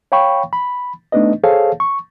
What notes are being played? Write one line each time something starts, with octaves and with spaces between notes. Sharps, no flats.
C#5 F5 G5 B5 C#6
B5
A3 B3 D4 D#4 B4 D#5
G#4 A4 C5 C#5 F5 A5
C#6